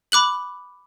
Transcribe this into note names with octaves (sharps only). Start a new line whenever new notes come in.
B5 D6 F#6 F#7